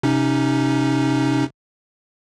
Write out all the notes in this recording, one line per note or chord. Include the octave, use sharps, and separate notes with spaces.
C3 C#4 D#4